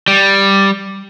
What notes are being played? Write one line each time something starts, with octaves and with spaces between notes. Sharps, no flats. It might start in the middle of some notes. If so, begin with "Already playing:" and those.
G3